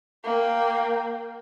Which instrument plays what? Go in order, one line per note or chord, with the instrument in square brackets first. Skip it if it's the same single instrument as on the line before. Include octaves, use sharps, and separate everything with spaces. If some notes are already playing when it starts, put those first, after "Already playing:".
[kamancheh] A#3 G5